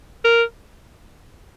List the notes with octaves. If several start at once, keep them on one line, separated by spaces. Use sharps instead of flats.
A#4